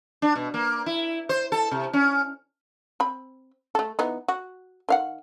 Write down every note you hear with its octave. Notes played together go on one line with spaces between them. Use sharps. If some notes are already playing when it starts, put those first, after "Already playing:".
D4
B2
A#3
E4
C5
A4
C3
C#4
C4 B5
A3 A4
E3 B3 D#4
F#4
D#3 F5 F#5